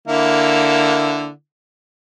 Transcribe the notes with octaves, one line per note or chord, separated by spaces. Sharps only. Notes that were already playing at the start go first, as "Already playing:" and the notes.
D3 A#3 E4